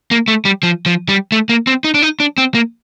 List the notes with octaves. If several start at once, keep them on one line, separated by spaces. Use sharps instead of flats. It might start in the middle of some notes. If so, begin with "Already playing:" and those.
A#3
A3
G3
F3
F3
G3
A3
A#3
C4
D#4
D4
D#4
D4
C4
A#3